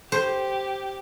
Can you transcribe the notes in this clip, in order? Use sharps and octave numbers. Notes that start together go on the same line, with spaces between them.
G4 C5